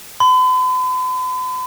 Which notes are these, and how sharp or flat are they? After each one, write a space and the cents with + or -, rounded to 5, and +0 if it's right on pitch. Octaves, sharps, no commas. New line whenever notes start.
B5 +45